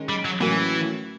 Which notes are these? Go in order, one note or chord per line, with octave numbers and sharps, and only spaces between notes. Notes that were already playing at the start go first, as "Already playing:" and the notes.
Already playing: D#3 G#3 C#4
G3
F#3
A2 E3 F#3 A#3 C#4 F#4